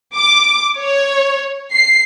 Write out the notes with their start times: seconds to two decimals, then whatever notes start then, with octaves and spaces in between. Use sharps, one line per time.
0.16 D6
0.79 C#5
1.72 C7